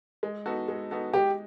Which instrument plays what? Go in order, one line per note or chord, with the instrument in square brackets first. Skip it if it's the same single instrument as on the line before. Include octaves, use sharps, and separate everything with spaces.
[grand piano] G#3
B3 D#4 F#4 A4
G#3
B3 D#4 F#4 A4
[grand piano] G#3 [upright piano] G4